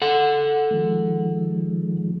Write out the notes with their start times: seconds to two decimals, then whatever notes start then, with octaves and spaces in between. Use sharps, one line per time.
0.02 A4 F#5
0.71 D#3 F3 G#3